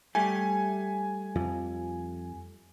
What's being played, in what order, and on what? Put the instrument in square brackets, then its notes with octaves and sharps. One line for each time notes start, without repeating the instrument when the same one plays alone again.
[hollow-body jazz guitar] G3 A3 G4 [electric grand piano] G#5
[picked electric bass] F2 F3